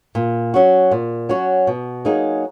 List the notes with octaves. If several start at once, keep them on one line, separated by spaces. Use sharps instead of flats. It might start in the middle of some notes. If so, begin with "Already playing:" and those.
A#2
F#3 C#4 F#4
A#2
F#3 C#4 F#4
B2
F#3 A#3 D#4 G#4